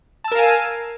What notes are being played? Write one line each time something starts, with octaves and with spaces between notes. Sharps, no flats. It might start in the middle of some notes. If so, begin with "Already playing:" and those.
A#4 F5 G#5 A5 E6